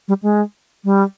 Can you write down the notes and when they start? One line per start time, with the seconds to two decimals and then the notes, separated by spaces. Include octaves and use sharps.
0.08 G3
0.23 G#3
0.84 G3